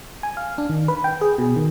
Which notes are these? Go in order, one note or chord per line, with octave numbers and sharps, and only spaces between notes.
G#5
F5
D4
D#3
B4
G5
G#4
B2
D#3